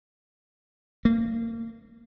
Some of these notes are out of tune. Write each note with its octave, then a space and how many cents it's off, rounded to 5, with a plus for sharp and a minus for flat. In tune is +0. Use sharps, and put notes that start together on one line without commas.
A#3 -30